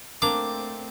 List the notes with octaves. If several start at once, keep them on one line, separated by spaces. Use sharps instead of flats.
A3 A#3 C4 D4 D6